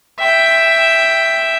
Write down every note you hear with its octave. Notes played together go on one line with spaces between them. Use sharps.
E5 G5